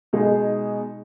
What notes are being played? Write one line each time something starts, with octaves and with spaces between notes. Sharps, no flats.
B2 G#3 D#4 G#4